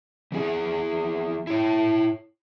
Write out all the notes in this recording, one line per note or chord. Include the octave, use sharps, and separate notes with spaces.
E3 B3 G#4
E4 C#5